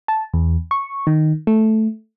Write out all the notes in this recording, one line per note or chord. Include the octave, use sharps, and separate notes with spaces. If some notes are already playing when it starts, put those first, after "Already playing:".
A5
E2
C#6
D#3
A3